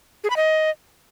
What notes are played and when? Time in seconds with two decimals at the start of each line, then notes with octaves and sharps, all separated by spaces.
0.24 G#4
0.30 B5
0.36 D#5